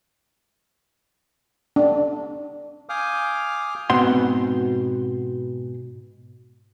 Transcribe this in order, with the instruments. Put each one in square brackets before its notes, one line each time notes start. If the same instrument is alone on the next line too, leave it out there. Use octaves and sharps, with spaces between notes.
[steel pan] D4
[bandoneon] F5 G#5 D6 D#6 F6 G6
[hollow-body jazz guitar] G#2 B2 C4 F#5 C6